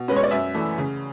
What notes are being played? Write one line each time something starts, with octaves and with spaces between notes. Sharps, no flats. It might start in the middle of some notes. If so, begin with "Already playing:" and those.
Already playing: B2
G#3 C#4 B4
C#5
D5
F#2 E5
E3 A3
C#3